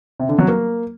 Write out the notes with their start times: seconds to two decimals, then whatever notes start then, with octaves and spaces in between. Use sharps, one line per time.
0.20 C3
0.29 D3
0.39 F#3
0.48 A#3